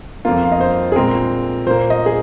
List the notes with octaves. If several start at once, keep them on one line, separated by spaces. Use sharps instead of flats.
F2 F3 A#3 F4
F5
D#5
C5
G#4
A#2 G#3 C4 A#4
A#2 A#3 C5
D#5
G#4